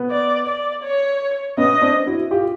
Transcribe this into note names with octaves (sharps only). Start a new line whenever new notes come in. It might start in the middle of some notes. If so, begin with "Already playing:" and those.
Already playing: B3
D5
D5
C#5
B3 C#4 D#5
C4 D4
E4 F#4
F4 G4